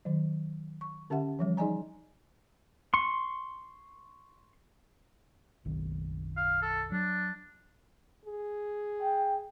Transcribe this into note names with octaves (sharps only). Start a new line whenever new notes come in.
D#3 F#3
C#6
D3 C#4 G4 E5 F#5
E3 F3 G3
D#4 G#4 D5 D#5 G#5 A#5
C6 C#6
F#1 B1 D#3
F5
A4
F#3 D4
G#4
G5